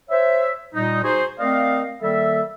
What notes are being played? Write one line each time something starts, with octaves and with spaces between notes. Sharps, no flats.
C5 C#5 E5
A#2 G3 D#4
D#4 F#4 G#4 C5
A3 C4 A#4 D5 D#5 F5
D#3 G3 A#3 A4 E5